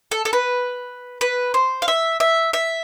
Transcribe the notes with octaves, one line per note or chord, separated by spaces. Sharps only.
A4
A4
B4
B4
C5
F5
E5
E5
E5